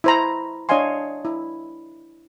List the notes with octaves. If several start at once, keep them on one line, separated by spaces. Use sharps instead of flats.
E4 C5 A#5
D4 C#5 D#5 F5 G#5 C6
E4